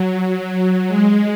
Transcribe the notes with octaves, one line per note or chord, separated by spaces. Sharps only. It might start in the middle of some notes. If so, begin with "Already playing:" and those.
Already playing: F#3
F#3
G#3